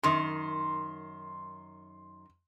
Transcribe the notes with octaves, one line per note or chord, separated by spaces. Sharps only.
F#2 D#3 C6